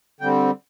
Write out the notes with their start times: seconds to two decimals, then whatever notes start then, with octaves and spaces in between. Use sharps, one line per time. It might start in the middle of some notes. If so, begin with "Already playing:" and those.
0.21 D3 G3 C4 G5